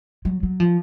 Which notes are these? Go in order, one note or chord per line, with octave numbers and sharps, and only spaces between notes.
F#3
F#3
F3